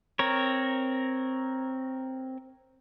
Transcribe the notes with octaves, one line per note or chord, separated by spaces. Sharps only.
C4 A#4 C#5